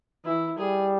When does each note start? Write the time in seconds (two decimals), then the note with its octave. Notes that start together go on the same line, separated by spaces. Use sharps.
0.25 E3 E4
0.58 G3 G#4